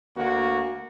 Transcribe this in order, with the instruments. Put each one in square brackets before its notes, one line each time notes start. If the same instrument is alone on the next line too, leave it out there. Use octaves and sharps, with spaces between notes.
[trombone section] D2 A#3 F#4